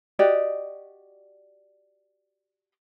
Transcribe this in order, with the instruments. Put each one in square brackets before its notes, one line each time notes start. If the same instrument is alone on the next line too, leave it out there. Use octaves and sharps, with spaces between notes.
[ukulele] F#4 G4 D5 D#5